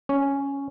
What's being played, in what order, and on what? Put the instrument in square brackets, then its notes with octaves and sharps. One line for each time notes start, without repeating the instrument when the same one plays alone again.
[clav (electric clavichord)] C#4